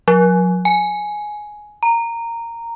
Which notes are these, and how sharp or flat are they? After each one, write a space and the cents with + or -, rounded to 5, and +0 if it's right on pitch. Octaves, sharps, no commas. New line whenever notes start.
F#3 -40
G#5 +10
A#5 -10